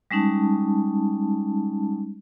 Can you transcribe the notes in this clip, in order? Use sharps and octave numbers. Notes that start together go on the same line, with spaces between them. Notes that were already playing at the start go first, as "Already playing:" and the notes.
G3 G#3 C#4 D#4 A5